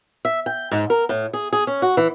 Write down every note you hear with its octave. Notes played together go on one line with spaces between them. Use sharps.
E5
G5
G#2
A#4
A2
G#4
G#4
C#4
F#4
E3